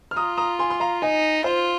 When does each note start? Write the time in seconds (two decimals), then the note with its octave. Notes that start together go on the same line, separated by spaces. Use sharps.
0.11 F6
0.16 F4 A#5 D#6
0.37 A#5 D#6
0.59 G#5 C6
0.70 C6
0.80 F5 A#5
1.02 D#4 D#5 G#5
1.44 F4 C5 F5